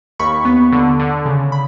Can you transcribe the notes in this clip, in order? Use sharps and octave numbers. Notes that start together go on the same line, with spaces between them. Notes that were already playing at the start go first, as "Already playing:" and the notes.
D#2 B5 C#6
B3
D3
D3
C#3
B5